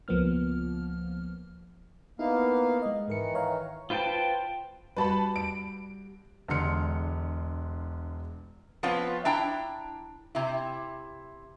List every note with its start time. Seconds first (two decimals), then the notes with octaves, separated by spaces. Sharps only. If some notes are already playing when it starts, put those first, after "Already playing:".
0.08 C#2 F3 A#3 B3 F6
2.19 A#3 B3 D#4 E4 F5
2.82 G#3 D#5
3.08 G#2 D#3 E3 A#4 C#7
3.35 C#5 F5 A#5
3.90 F4 B4 C5 G5 A5
4.96 G3 F#4 B4 A5 B5
5.36 D7
6.48 E1 D3 G#3 C6 F6 C#7
8.83 F3 B3 C4 F4 C#5
9.25 D4 E4 G5 A#5
10.35 C3 E4